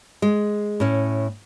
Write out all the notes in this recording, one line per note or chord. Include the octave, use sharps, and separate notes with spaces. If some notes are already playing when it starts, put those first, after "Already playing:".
G#3
A2 C#4